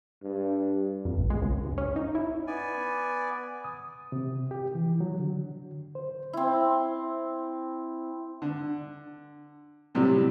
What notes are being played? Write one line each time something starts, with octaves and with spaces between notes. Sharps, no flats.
G2
F2
A1
G#3
C#2
G2
C#4
D#4
E4
B3 D5 G#5
D#6
C3
G4
E3
F#3
D3
C5
C4 E4
D3
A2 C3 F#3 G3